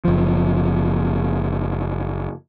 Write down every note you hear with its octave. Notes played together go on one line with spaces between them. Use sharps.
F#1 F3